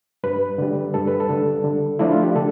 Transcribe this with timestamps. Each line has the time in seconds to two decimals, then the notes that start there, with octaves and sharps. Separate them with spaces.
0.24 G2 B4
0.58 D3 G3
0.94 G2 A4
1.07 B4
1.20 A4
1.29 D3 G3
1.64 D3
1.99 F3 A3 D4 E4
2.11 F4
2.23 G4
2.35 D3 A4